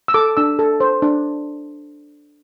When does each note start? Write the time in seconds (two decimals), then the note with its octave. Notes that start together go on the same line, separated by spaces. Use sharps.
0.08 E6
0.14 A4 D6
0.37 D4 E6
0.59 A4
0.80 C5
1.02 D4